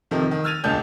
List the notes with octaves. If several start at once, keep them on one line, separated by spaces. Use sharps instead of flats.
F2 C3 D#3 F3
D#3
E6 F6 G#6 A6 D#7 F7
E1 C#2 A#2 D4 A5 G6